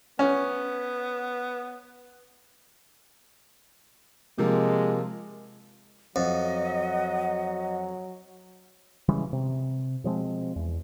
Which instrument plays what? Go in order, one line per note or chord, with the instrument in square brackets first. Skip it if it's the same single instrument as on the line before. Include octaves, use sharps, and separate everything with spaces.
[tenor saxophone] B3 [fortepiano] C#4
[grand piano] C3 F3 A#3 [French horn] G#3
[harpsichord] F2 [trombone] F#3 [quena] D#5 [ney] F#5
[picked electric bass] C#3 E3 G3 G#3
C3
B2 F3 G#3 C4
E2